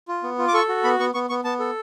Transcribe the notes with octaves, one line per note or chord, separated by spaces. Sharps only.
F4
B3
F4
D6
A4 C#6
F#4
B3 B5
B3 C#6
B3 C#6
B3 C#6
B3 A5
A4